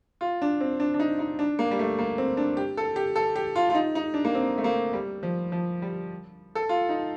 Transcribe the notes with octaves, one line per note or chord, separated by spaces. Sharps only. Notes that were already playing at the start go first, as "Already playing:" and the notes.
F4
D4
C4
D4
D4
D#4
D#4
D4
A#3
G3
A3
A#3
C4
D4
G4
A4
G4
A4
G4
F4
F4
D#4
D#4
D4
A#3
C4
A3
A#3
G3
F3
F3
G3
A4
F4
D#4